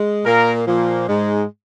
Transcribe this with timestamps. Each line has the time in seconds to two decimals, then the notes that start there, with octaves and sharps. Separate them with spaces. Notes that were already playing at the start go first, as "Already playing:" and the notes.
Already playing: G#3
0.25 A#2 A#3 A#4
0.66 A#2 F3 A#3
1.08 G#2 G#3